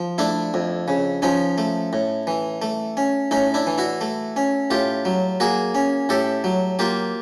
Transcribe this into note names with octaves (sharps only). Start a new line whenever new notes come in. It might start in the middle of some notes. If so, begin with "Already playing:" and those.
Already playing: F3
A3 D4 E4
F2
C#3
F3 C#4 D#4
A3
A2
E3
A3
C#4
A2 C#4 D#4
D4 E4
E3
E4 F#4
A3
C#4
A2 F4 G4
F#3
A#3 F#4 G#4
C#4
A2 G4 A4
F#3
A#3 F4 G4